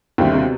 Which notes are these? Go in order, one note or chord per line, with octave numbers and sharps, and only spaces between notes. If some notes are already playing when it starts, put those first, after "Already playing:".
D#2 B2 D3 G3 C4 E4
C3